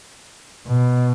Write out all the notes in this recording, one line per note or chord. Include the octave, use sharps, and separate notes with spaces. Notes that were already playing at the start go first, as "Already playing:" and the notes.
B2